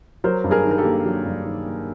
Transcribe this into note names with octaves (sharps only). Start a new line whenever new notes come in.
F#3 A#4 C5
G2
G#4 A#4
D#3
A#4
G4 A4
A#3
F#3
G2
D#3
A#3